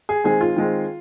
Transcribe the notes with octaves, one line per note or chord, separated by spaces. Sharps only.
G#4
D#3 G#3 C4 G#4
F4
D#3 G#3 C4